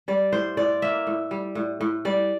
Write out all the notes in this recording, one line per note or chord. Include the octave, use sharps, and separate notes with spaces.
G3 D5
A2 C5
A2 D5
A#3 E5
A2
G3
A2
A2
G3 D5